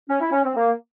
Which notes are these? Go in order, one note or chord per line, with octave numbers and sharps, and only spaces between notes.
C#4
E4
C#4
C4
A#3